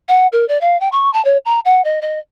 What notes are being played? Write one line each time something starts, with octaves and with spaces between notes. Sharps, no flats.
F#5
A#4
D5
F5
G5
C#6
A5
C#5
A#5
F#5
D#5
D#5